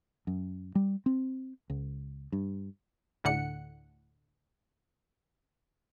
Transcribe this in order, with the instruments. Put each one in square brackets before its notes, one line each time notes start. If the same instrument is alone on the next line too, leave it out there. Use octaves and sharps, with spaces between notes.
[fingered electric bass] F#2
G3
C4
C#2
G2
[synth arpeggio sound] D2 A2 D3 F#5 C#7